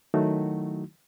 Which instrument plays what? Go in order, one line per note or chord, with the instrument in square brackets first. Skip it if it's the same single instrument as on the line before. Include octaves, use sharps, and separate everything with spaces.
[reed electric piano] D#3 F#3 A3 D#4 E4 F#4